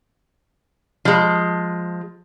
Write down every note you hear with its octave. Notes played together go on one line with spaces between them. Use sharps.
F3 G#3